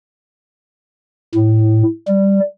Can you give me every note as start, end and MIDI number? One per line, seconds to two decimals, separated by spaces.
1.35 1.83 45
2.08 2.40 55